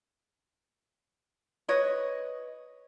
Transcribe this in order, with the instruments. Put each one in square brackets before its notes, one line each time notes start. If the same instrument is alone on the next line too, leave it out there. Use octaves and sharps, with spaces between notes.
[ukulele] B4 C#5 D#5